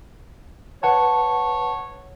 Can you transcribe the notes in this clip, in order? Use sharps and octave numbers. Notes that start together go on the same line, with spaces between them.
B4 C#5 F#5 A5